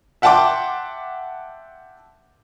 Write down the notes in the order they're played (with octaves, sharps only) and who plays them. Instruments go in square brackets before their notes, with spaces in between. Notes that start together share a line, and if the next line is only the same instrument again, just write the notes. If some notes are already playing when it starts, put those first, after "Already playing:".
[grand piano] E5 F#5 G5 A5 C6 D6